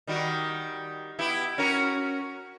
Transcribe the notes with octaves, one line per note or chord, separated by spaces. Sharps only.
D#3 G3 F#4
B3 E4 G4
C#4 F#4 A#4